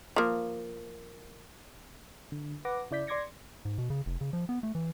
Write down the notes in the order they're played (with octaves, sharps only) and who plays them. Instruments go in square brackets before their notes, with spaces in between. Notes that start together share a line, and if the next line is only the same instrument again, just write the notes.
[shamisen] F3 A#3
[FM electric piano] D3
B4 F#5 D6 A#6
C#3 E4 D5 G6 B6
D5 C6 D6 G#6 A#6 C#7
[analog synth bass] G#2
B2
C#3
F1
C#3
F3
B3
A3
E3